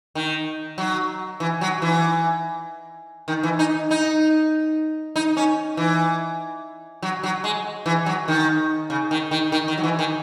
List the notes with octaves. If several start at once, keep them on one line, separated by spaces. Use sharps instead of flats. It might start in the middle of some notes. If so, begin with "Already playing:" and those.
D#3
F#3
E3
F#3
E3
D#3
E3
D#4
D#4
D#4
C#4
E3
F#3
F#3
G#3
E3
F#3
D#3
C#3
D#3
D#3
D#3
D#3
F#3
E3
D#3